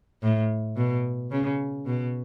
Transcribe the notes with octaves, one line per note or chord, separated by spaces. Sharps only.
A2
B2
C#3
B2